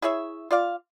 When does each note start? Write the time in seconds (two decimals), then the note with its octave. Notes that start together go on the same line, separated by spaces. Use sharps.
0.02 E4 G#4 C#5 E5
0.51 F4 D5 F5